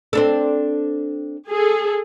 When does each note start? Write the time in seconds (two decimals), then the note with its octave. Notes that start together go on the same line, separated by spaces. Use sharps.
0.13 C4 D4 A4
1.48 G#4 A4